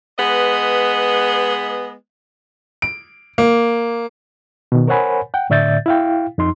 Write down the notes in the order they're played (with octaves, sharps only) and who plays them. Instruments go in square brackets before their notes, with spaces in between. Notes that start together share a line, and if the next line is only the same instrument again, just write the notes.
[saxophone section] G#3 B3 B4 D#5
[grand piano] D7
A#3
[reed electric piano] B2 D#3
A#4 C5 C#5 F#5 G#5 B5
F#5 G5
A2 D3 D5 E5 G6 A6
E4 F5 G5
F2 D#4 C6